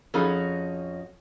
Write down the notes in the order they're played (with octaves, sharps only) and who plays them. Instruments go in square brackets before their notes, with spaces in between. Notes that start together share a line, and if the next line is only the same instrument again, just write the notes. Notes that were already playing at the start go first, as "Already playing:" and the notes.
[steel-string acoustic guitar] F2 [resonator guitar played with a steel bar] C#4 D#4 F#4 [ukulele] G#4 A4 B5